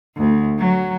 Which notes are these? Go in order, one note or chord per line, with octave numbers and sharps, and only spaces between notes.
D2
F#3